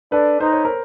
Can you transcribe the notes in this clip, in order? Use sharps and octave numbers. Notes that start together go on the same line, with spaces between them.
D4 A4 B4
D#4 C5
C#5
A#4 C5